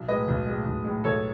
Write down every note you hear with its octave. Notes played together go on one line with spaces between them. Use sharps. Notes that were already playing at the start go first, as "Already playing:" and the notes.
Already playing: B1
A2 G#3 B4 D#5
B1
A2 G#3
B1
A2 G#3
B1 A4 C#5